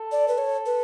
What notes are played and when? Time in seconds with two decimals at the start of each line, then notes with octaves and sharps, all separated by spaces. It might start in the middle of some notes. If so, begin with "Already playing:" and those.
Already playing: A4
0.12 D5
0.28 B4
0.38 C#5
0.66 B4